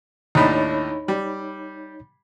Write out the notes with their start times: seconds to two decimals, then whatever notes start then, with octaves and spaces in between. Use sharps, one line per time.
0.35 D#2 A2 D4 D#4 C#5 B5
1.08 G3